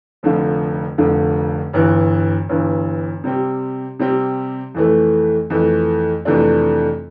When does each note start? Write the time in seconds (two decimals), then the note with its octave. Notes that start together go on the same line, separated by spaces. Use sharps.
0.23 F1 F2 D3 F3
0.98 F1 F2 D3 F3
1.73 G1 G2 E3
2.49 G1 G2 E3
3.24 C3 G3 C4 G4
3.99 C3 G3 C4 G4
4.74 F2 E3 A3
5.50 F2 E3 A3
6.25 F2 C3 E3 A3 D4